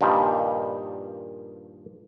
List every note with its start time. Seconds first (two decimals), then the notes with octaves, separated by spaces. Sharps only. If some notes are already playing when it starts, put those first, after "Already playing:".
0.01 G2 A#2 D#3 F3 G3